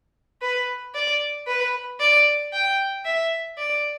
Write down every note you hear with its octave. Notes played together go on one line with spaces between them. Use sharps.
B4
D5
B4
D5
G5
E5
D5